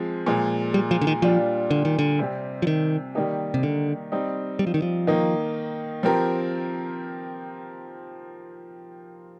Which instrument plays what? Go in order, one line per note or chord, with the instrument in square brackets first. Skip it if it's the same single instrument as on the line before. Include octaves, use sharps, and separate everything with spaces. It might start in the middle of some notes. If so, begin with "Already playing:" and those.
Already playing: [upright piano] F3 G#3 C4
A#2 F3 G#3
[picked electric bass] G3
F3
D3
D#3
[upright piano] A#2 G3 D4 F4 [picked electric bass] F3
[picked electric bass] D3
D#3
D3
[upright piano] C3 G3 C4 G4
[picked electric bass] F3
D#3
[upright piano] D#3 G3 A#3 D#4 G4
[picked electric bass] C3
D3
[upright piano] G3 C4 D#4
[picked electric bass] G3
F3
D#3
F3
[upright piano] D#3 A#3 D#4
F3 C4 G4 A#4